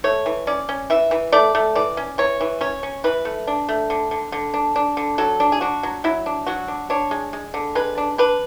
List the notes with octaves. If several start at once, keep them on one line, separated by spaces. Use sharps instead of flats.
A3 C#5
E3
C#4 D5
C#4
E3 E5
E3
A3 D5
A3
E3 D5
C#4
E3 C#5
E3
C#4 C#5
C#4
E3 B4
A3
D4
A3
D3
D3
D3
D4
D4
D3
F#3 A4
D4
G#4
D4 F#4
F#3
F#3 E4
D4
F#3 F#4
D4
D4 C#5
G#3
G#3
D3
G#3 B4
D4
D4 B4